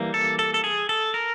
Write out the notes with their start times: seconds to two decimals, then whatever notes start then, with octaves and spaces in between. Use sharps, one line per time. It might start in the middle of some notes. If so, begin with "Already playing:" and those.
Already playing: E3 G3 A#3
0.14 A4
0.39 A4
0.54 A4
0.64 G#4
0.89 A4
1.14 A#4